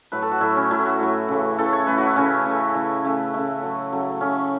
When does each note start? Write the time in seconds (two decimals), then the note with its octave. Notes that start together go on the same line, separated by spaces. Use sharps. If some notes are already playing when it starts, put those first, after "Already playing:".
0.12 A2 F#3 A3 B4
0.22 A4
0.31 F#4
0.41 A2 F#3 A3 E4
0.56 C#4
0.71 A2 F#3 A3 E4
0.86 F#4
1.00 A2 F#3 A3
1.29 C#3 E3 A3
1.58 C#3 E3 A3 A4
1.73 C#5
1.87 C#3 E3 A3 B4
1.98 F#4
2.06 E4
2.16 C#3 E3 A3 C#4
2.45 C#3 A3
2.75 C#3 A3 E4
3.05 C#3 A3
3.34 C#3 A3 E4
3.63 C#3 F#3 A3
3.92 C#3 F#3 A3
4.21 C#3 F#3 A3 C#4